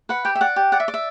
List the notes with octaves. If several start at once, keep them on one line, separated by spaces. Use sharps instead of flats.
B4 F#5
G4 G5
E5
D5 F#5
G4
D5 F#5
E5
D5
E5